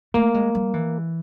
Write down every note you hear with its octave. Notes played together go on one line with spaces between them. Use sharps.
A3 A#3
G#3
G3
E3